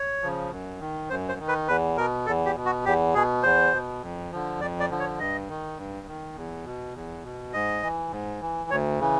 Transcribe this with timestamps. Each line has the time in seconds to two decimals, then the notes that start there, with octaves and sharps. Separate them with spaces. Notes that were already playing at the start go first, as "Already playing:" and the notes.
Already playing: C#5
0.22 C#3 F3
0.51 F#2
0.80 D#3
1.10 F#2 C5
1.29 C5
1.39 D#3
1.48 B4
1.68 E2 B4
1.97 B2 A#4
2.26 E2 A4
2.46 G4
2.56 B2
2.65 F#4
2.85 E2 G4
3.14 B2 G#4
3.43 E2 C5
3.73 B2
4.02 F2
4.31 D3 F3
4.61 F2 D5
4.80 D5
4.90 D3 F3
4.99 C#5
5.19 G2 D#5
5.49 D#3
5.77 G2
6.07 D#3
6.36 E2
6.65 B2
6.95 E2
7.24 B2
7.53 G#2 D#5
7.83 E3
8.11 G#2
8.41 E3
8.70 D2 C#5
9.00 C#3 E3